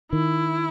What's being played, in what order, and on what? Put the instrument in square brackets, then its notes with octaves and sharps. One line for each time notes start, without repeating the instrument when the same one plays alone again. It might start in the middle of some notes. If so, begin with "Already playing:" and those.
[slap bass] D#3 [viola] E4